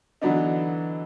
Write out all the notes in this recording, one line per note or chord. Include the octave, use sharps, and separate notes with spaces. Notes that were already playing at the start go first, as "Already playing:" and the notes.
D3 E3 F#3 B3 D4 D#4